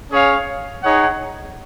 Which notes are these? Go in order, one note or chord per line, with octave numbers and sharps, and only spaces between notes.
C#4 G#4 C#5 F5
D#4 G#4 C#5 F#5